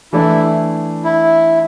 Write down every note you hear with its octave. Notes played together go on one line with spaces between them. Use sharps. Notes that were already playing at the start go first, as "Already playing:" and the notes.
E3 A3 D4 E4
E4